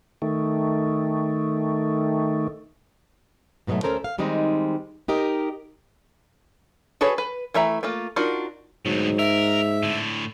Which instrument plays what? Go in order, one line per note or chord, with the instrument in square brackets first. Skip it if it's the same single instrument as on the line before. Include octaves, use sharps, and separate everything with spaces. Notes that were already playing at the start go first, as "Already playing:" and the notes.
[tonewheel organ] D#3 A3
[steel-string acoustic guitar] G#2 B2 F3 F#3 A3
D2 E3 C#4 A4 A#4 C5
F5
D#3 G3 G#3 C4 D#4
D#4 G4 A#4 D#5
[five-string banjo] F#4 G#4 A4 B4 C#5
B4
E3 A3 E5 A#5
A3 A#3 F4
D4 D#4 F4 F#4 A#4
[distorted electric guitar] D2 B2 [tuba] G#2 [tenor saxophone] F#3
[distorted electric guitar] A#4 [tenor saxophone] E5
[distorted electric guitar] A2 D3